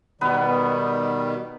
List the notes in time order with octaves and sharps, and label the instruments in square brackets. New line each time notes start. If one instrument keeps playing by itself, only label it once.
[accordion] B2 D#3 G3 [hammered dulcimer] B3 D#4 B4